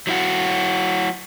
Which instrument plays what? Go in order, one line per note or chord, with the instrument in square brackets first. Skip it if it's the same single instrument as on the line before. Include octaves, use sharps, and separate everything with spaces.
[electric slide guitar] F#3 E4 F#4